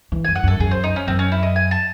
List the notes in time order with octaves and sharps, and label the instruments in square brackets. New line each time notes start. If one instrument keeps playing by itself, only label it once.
[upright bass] E3
[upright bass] F#2 [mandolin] G#5
[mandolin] F#5
[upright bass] F#2 [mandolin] A4
[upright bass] F#2 [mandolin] G#4
[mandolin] C5
D#4
C#4
[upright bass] F#2 [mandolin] C4
[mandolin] C#4
E4
D#5
G#5
A5